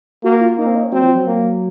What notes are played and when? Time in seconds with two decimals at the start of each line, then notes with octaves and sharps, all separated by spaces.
0.23 A#3 F#4
0.41 F4
0.58 A#3 D#4
0.66 C4
0.76 D#4
0.84 C#4
0.92 F#3 C4
1.03 F3
1.15 F#3
1.26 A#3